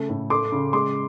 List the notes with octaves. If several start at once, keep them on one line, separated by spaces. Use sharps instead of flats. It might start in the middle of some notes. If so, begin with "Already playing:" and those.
Already playing: C#3 A3
A2
A3 C6 D6
C#3
G#3 C6 D6